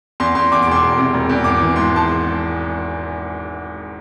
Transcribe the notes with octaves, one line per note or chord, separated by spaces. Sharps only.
E2 C6
E2 C6
E2 D6
D6
E1 C6
E1
C3
E1
E2
G#1 D6
E3
G#2 C6
A5